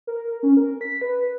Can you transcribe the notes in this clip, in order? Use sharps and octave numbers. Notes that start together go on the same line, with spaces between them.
A#4
C#4
A#4
B6
B4